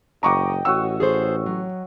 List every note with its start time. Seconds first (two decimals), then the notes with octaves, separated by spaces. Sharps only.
0.23 F#1 D#5 F#5 G5 A#5 C#6 D6
0.65 A1 F#4 C#5 F#5 E6
1.00 G#4 A4 C5
1.46 F#3